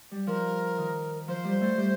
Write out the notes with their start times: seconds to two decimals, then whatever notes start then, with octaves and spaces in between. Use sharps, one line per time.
0.11 G3
0.27 F3 A#4
0.78 D#3
1.28 F3 C5
1.44 G3
1.61 A3
1.78 G3